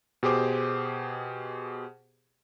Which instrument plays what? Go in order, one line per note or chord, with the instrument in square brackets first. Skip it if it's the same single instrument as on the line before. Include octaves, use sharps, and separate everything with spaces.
[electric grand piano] B2 G4 G#4 C5 D6